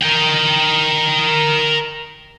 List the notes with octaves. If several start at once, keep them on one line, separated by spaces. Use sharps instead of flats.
A#4 G5